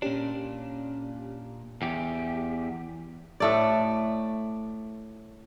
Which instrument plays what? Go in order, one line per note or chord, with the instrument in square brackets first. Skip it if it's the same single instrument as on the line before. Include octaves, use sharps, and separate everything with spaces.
[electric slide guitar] A#2 D4 [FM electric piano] C#4 G4
[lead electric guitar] E2 G4
[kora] A2 A3 D5